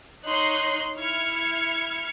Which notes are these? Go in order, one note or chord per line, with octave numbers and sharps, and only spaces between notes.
D#4 C#5 C6 F#6 C7
E4 F6 G#6 C#7